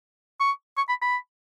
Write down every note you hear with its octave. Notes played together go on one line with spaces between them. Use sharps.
C#6
C#6
B5
B5